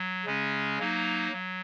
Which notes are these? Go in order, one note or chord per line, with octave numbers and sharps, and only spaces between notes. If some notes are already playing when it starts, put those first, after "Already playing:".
Already playing: F#3
C#3 G#3 C#4
F#3 A#3 D#4
F#3